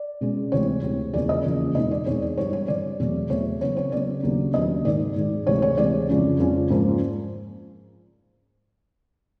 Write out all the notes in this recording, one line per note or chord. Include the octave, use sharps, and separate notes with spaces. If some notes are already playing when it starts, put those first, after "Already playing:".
Already playing: D5
B2 G#3 C#4
D2 C3 E3 G#3 C4 C#5
D2 C3 E3 G#3 C4
E2 C#3 F3 A#3 C#4 D5
D#5
E2 C#3 F3 A#3 C#4
E2 B2 G#3 C4 D#4 D#5
D5
E2 B2 G#3 C4 D#4 C#5
D5
G2 E3 G3 C#5
C#5
G2 E3 G3 D5
E2 B2 F#3 A3 C4
E2 B2 F#3 A3 C4 C#5
C#3 F#3 B3 C#5
C#5
C#3 F#3 B3 D5
D#2 C#3 F#3 B3 D4
D#2 C#3 F#3 B3 D4 D#5
G#2 D#3 G#3 D5
G#2 D#3 G#3
D2 C3 E3 G#3 C#5
C#5
D2 C3 E3 G#3 D5
F2 C#3 F3 G#3 C#4
F2 C#3 F3 G#3 C#4
G#2 F3 A#3 C#4